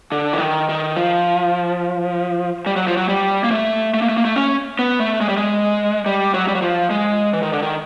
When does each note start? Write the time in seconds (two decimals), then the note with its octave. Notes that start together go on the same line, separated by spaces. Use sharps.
0.12 D3
0.33 E3
0.40 D#3
0.69 D#3
0.96 F3
2.66 G3
2.76 F#3
2.87 F3
2.97 F#3
3.09 G3
3.44 A#3
3.51 A3
3.94 A3
4.02 A#3
4.09 A3
4.17 A#3
4.25 A3
4.36 C#4
4.79 B3
5.00 A3
5.21 G#3
5.29 G3
5.37 G#3
6.06 G3
6.34 F#3
6.48 G3
6.55 F#3
6.62 F3
6.90 G#3
7.33 E3
7.43 D#3
7.53 D3
7.62 D#3